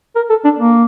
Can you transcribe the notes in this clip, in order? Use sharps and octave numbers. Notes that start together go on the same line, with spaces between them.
A#4
A4
D4
A#3